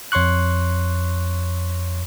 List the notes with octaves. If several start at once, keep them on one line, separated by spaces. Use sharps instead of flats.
F2 C#5 C6 C#6 F#6